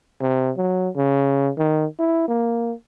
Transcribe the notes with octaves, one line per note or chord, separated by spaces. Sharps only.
C3
F#3
C#3
D#3
E4
A#3